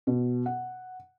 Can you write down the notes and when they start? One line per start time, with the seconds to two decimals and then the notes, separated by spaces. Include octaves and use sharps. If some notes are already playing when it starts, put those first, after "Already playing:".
0.07 B2
0.46 F#5